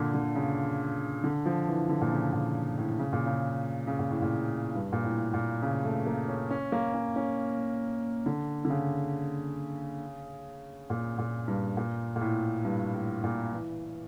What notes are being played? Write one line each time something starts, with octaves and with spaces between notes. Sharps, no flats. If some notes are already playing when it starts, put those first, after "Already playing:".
Already playing: A#2 D3
D3
C#3
D3
F3
E3
D3
A#2
C#3
A#2
A2
C#3
A#2
C#3
C#3
A#2
A2
A#2
G2
A#2
A2
A#2
C#3
A3
A#3
C#4
C#4
A#3
C#4
C#4
D3
D3
C#3
A#2
A#2
G2
A#2
A#2
A2
G2
A2
A#2
E3